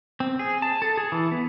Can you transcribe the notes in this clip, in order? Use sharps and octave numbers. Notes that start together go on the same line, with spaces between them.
C4
G#4
A5
A4
G#4
E3
B3